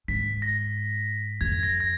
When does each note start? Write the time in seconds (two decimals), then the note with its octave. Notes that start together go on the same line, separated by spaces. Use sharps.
0.08 G#2 B6
0.42 A#6
1.41 F2 G#6
1.63 A#6
1.80 A#6